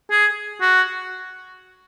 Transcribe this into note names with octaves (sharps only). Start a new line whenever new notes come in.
G#4
F#4